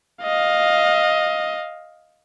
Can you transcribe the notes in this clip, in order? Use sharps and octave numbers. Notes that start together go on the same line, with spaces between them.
D#5 F5